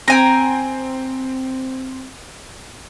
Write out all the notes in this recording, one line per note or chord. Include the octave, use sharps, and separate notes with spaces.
C4 G5 G#5 A#5